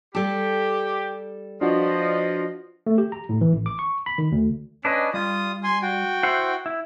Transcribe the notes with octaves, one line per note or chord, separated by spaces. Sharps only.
G3 G4 A4
F3 D4 F4 F#4 B4 D5 D#5
A3
G4
A#5
A2
E3
A1
D6
C#6
B5
D#3
D2
C#4 D4 B4 D#5
G3 F4 D#6
G#5 C6
F#4 G5
E4 C5 F#5
E4